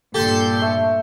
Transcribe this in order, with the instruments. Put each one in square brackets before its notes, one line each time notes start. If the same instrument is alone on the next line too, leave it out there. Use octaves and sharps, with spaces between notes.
[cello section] G2 A#2 [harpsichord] G4 C6 [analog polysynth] A4 G6
[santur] A3